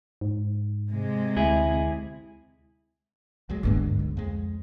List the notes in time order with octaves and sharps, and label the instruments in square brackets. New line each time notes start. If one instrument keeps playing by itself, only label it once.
[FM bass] G#2
[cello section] C3 G#3
[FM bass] D2 [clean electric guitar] E4 G#4
[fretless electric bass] C#2 F#3 G#3
[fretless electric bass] D2 D3 G#3 [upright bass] G2 B3
[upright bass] C#2
[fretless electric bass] F2 G#3